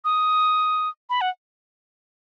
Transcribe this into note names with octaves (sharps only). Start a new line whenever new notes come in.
D#6
B5
F#5